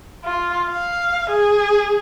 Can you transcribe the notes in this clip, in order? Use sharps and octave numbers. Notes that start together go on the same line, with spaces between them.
F4
F5
G#4